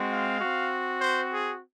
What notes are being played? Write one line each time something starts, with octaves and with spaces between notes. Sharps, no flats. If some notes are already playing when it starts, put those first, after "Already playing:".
Already playing: G#3 C4 F#4
F5
C4 F#4
C5
G#4